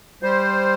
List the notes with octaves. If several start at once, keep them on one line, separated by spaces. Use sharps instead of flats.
G3 C5